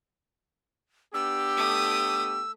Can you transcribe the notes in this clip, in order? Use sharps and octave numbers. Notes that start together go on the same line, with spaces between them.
B3 D4 G4 E6
A3 D#6